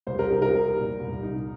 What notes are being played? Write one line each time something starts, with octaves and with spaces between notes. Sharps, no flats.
C2 C5
A#4
D#4 G4
A#4
G3
A#2
C2
D#4